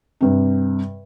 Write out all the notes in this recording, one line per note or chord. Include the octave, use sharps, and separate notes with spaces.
G2 C3